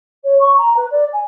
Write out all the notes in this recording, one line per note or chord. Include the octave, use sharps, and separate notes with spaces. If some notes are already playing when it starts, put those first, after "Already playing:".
C#5
C#6
A#5
B4
D5
G#5